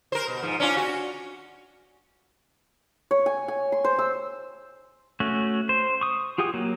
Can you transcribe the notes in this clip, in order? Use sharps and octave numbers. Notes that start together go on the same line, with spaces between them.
A#4 C5
B2
G#2 F3
C#4 D4 F4
F#4
C#5
G#5
G#5
C6
C5
E6
A3 C#4 F#4
C5
C#6 D#6
F4 G4 G#4 F#5 D#6
F#3 A#3